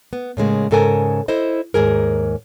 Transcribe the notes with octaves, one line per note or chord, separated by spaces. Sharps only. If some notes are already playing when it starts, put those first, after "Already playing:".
B3
A2 C#3 G#3 A#3
G#2 C#3 A4 A#4 G#5
E4 A4 C5 D#5
D#2 G#2 G#4 A#4